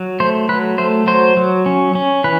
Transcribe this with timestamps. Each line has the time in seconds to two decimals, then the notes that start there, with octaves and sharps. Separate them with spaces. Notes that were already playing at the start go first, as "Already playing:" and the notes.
Already playing: F#3
0.20 A3 C5
0.49 F#3 B4
0.78 A3 C5
1.07 F#3 C5
1.37 F#3
1.66 C#4
1.95 C#4
2.24 E3 B4